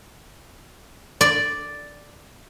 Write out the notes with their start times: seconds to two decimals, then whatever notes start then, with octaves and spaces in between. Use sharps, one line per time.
1.21 D5